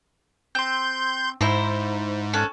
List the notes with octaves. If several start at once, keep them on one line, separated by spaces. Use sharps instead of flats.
C4 C6 G6
G#2 E4 C5 A#5
C#4 A4 F#6